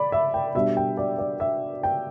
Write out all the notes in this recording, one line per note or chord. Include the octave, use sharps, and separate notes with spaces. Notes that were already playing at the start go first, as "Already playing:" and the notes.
Already playing: D5 B5
E5
G5
B2 G3 D4 E5
G5
D5
D5
E5
G5